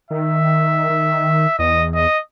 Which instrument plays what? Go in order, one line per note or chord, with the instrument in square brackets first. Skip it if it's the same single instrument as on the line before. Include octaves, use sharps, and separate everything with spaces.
[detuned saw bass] D#3 [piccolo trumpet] E5
[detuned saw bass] D#3
[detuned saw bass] E2 [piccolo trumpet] D#5
[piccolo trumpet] D#5